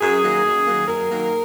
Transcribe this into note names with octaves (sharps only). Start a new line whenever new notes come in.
F#2 G#4
D#3 F#3 A#3
F#2
D#3 F#3 A#3
F#2 A#4
D#3 F#3 A#3